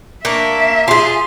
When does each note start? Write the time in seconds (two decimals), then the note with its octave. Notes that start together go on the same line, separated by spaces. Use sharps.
0.25 A#3 D4 E5 C#6
0.88 F4 G#4 C6